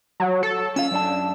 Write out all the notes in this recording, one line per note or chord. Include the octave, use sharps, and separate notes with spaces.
F#3
A4
C#4 F4 F5 E6
F#2 D4 A5